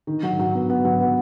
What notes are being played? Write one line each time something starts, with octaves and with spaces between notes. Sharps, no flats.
D#3
F#3
F#3
B3
B3
F#3
B3